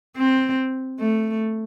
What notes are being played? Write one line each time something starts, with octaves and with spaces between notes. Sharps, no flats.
C4
A3